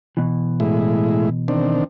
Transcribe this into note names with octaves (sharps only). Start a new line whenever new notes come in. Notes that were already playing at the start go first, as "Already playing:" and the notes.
B2 E3
A2 G#3 E4
D#3 C4 D4